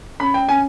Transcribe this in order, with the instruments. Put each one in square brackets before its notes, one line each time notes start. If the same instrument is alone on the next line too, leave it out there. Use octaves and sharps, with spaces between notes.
[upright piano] C#4 [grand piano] B5
[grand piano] G5
[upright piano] C#4 [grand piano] G#5